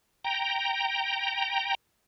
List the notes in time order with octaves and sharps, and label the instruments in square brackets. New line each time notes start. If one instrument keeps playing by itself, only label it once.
[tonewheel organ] G5 A#5